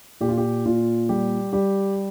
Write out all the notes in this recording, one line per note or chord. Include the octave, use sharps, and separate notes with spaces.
A#2 G4
F4
G4
A#2 F4
G3 G4
G3 G4